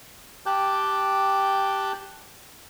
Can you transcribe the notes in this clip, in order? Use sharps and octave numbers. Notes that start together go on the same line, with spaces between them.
G4 G5 A5 D6 F#6 G6